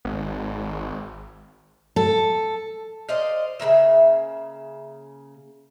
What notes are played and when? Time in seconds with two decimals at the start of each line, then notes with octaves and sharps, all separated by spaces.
0.05 G#1
1.96 A4
3.09 C5 D5 D#5 F5
3.60 C#3 G#3 A#3 E5